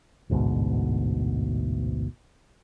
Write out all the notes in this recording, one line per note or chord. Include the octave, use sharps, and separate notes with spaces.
A1 D2 G#2 B2